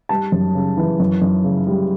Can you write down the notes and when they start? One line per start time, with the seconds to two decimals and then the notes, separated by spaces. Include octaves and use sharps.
0.09 G3 A5
0.32 F#2
0.55 C#3
0.77 E3
1.00 F#2
1.22 F#2
1.44 C#3
1.67 G3